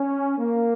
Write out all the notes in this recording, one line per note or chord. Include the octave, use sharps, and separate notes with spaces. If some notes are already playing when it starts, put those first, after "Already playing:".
Already playing: C#4
A#3